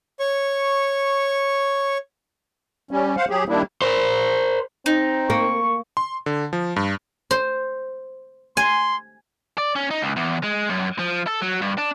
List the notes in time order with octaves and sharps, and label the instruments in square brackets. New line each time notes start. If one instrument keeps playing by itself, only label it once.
[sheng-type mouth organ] C#5 C#6
[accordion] G3 C#4
C5 F5 F#5
F#3 G4 G#4
D#3 G3 A#3 D4 E4
[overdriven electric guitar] A#4 C5
[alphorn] C4 [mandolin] D#4
[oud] A#3 [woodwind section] C#6
[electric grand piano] C6
D3
F3
G2
[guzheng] C5
[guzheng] G#5 [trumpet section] C6
[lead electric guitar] D5
C#4
D#4
C#2
E2
G#3
F#2
F3
A4
F#3
G2
D4